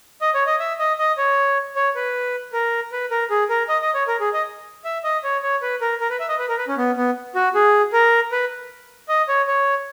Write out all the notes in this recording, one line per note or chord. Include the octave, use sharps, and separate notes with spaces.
D#5
C#5
D#5
E5
D#5
D#5
C#5
C#5
B4
A#4
B4
A#4
G#4
A#4
D#5
D#5
C#5
A#4
G#4
D#5
E5
D#5
C#5
C#5
B4
A#4
A#4
B4
E5
D#5
B4
A#4
B4
C#4
B3
B3
F#4
G#4
A#4
B4
D#5
C#5
C#5